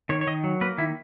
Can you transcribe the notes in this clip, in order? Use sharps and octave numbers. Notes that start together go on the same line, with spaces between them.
D#3 C#5
C#5
D#3 D#5
F#3
A#3 B4
D#3 E4